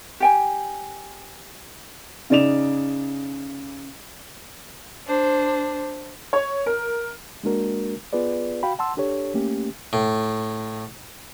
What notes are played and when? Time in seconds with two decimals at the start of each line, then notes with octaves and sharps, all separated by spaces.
0.20 G4 G5 G#5
2.30 C#3 D#4 D5 E7 F7
5.07 D4 C5
6.33 C#5
6.66 A#4
7.43 G#3 A#3 D4 F#4 A#4
8.13 B3 F4 G#4 B4 D5
8.63 F#4 F5 G5 B5
8.79 F#5 A5 C6 E6
8.97 D4 G4 A4 C#5
9.34 A3 A#3 C#4 G4
9.93 A2